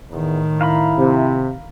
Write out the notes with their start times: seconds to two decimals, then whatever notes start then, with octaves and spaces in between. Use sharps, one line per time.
0.11 E2 A2 D#3
0.61 E4 F5 A#5 B5
0.98 C3